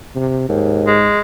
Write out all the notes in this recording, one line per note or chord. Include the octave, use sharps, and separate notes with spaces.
C3
D#2 G#2
G#3